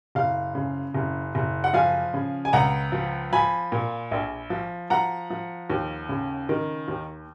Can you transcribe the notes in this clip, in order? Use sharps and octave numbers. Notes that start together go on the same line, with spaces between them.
F#1 F5
C#3
F#1
F#1
F#5
F3 F5 G#5
C#3
G#5
C#2 F#5 A#5
F3
F3 G#5 B5
A#2
A#1
F3
F3 F#5 A#5
F3
D#2
C#3
D#3
D#2